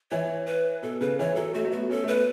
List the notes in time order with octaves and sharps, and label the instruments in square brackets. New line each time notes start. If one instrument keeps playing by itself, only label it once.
[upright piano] E3 [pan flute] C#5
[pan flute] B4
[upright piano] B2 [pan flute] A4
[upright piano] C#3 [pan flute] B4
[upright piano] E3 [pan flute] C#5
[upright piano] F#3 [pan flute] A4
[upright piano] A3 [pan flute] F#4
[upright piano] A3
[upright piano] B3 [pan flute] F#4
[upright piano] C#4 [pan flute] A4
[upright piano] A3
[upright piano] B3 [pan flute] B4